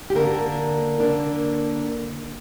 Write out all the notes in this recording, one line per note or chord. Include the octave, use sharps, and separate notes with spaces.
G4
D3 A#3 D4 A#4
D3 A#3 D4